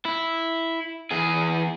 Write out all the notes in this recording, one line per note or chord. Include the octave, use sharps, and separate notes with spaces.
E4
E2 G#4